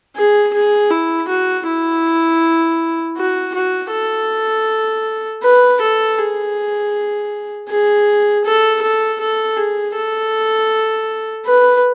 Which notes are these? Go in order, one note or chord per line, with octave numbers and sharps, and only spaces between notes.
G#4
G#4
E4
F#4
E4
F#4
F#4
A4
B4
A4
G#4
G#4
A4
A4
A4
G#4
A4
B4